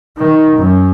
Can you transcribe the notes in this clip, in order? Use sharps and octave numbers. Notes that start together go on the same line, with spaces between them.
D#3
F#2